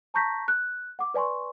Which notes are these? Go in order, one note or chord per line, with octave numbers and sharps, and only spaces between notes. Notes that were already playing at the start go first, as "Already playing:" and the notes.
A5 A#5 C#6 G6 A#6 B6
F#6
F#5 D6
B4 D5 G#5 C6 C#6